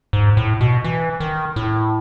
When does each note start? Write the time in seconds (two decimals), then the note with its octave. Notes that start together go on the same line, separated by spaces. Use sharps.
0.13 G#2
0.37 A2
0.61 B2
0.84 E3
1.20 D#3
1.56 A2